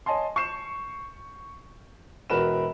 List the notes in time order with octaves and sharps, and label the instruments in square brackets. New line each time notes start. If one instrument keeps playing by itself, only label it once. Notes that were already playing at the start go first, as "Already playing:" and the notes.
[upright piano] C#5 D#5 G#5 A5 C6
C#6 G6 C7 E7
E1 F#4 A#4 B4 B5 E7